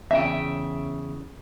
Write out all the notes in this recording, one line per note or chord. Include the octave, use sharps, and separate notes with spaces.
E2 C#3 E5 G5